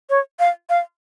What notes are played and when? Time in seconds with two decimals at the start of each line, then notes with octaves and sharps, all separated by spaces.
0.10 C#5
0.39 F5
0.70 F5